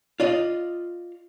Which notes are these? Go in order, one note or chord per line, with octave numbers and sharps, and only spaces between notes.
F4 D5 D#5